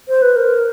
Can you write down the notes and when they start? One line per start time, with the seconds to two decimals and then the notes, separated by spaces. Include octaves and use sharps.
0.08 C5
0.22 B4
0.36 A#4